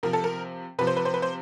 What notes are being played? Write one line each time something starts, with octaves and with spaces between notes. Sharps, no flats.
C3 F3 A#4
A4
A#4
C3 F3 B4
C5
B4
C5
B4
C5